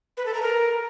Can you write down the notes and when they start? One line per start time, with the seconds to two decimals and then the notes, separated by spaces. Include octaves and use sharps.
0.17 B4
0.26 A4
0.34 A#5
0.42 A#4